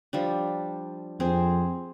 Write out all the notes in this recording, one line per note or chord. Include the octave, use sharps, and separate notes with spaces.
F3 G3 D4
F2 C4 G#4 C5